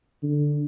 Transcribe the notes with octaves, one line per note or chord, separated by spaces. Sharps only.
D3